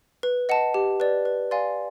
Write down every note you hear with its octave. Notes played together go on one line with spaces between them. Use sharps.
B4
D#5 F#5 A5
G4
B4 D5
B4
D5 F5 G#5 C6